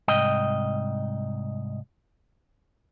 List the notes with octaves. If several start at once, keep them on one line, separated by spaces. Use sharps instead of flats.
C2 G#2 D#5 G5